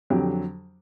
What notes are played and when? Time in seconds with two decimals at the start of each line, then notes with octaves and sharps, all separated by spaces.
0.10 F2 D3 F#3 G4